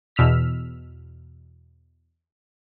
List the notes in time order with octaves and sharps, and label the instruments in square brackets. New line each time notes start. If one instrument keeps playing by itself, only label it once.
[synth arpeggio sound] E2 B2 E6 F6 B6